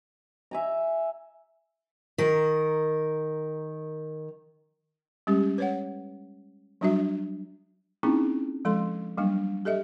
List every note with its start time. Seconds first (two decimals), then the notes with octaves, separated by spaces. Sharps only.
0.51 E5 G#5 A#5
2.18 D#3 A#4
5.27 G3 G#3 C#4 G4
5.58 B4 C#5 F#5
6.81 F#3 G3 D4 F#4 E5
8.03 A#3 C4 C#4 D#4 E4 G#4
8.65 F3 G#3 A4 C6
9.18 F#3 G3 A#3 D4
9.65 G4 A4 D#5 E5